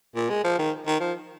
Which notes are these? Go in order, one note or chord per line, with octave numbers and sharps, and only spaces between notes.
A#2
G#3
F3
D#3
D#3
F3